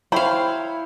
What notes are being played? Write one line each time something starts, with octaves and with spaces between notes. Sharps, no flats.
E4 C5 C#5 F5 G5 B5